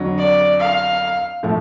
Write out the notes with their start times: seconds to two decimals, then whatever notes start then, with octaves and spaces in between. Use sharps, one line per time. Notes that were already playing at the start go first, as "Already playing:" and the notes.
Already playing: F2 D3 F#3
0.18 D5
0.60 F5
1.43 A2 F3 A3